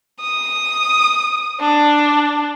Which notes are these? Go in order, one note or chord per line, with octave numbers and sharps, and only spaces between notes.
D#6
D4